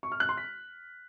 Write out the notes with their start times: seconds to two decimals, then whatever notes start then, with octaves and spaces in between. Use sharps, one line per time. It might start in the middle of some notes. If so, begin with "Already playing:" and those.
0.03 C#6
0.12 F6
0.20 F#6
0.29 C6
0.37 B6